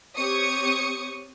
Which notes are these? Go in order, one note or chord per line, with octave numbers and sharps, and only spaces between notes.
C4 G4 C#5 C#6 D#6 C#7